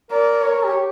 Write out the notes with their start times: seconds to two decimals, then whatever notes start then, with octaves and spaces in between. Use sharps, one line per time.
0.11 A#4 D5
0.42 A#4 C#5
0.53 A#4
0.64 G4
0.75 G4